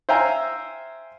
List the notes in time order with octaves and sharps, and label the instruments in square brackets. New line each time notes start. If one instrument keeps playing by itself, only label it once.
[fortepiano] C5 E5 F5 G5 G#5 A#5